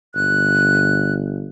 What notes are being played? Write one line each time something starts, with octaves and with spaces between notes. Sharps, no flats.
G1 F#6